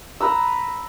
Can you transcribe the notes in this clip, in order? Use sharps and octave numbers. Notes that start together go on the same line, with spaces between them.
B4 A#5 E6